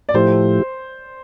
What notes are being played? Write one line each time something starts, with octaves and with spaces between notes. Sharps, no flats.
D5
A2 F3 A3 E4 G4 C5